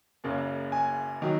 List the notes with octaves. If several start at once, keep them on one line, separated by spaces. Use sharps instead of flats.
F#1 F#2 C#3 A#3
G#5
D#3 F#3